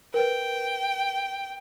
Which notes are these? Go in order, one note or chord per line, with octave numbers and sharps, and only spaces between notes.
A#4 B4 G5